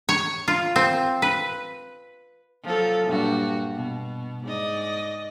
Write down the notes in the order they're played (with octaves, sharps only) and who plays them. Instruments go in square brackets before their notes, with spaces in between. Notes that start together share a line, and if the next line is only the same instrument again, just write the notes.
[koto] C#5
F4
C4
B4
[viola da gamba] F3 F#3 A4
G2 A#2 F#4
B2
G#2 D5 D#5